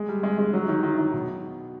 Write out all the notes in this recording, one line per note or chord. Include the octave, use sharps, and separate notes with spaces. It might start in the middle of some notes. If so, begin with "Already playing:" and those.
Already playing: G#3
G3
G#3
G#3
F#3
D#3
D#3
D#3
B2